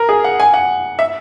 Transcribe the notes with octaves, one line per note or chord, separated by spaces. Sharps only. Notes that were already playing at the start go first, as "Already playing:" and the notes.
Already playing: A#4
G#4
F#5
G#5
F#5
E5